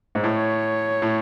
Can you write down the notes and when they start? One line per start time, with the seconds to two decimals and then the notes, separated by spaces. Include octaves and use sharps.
0.15 G#2
0.23 A2 C#5
1.02 A2